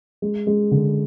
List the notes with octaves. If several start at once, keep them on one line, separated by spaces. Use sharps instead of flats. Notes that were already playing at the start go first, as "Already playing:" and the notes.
G#3
G#3
D3